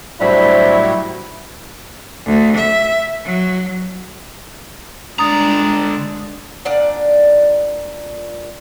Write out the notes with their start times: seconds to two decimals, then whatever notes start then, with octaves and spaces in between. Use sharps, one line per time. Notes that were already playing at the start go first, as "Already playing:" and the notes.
0.21 A2 F#3 G3 D4 E4 C5 B5
2.26 D2
2.56 E5
3.24 F#3
5.19 D3 G#3 D4 A#5 D#6 A6
6.65 A#2 D4 D5 F#5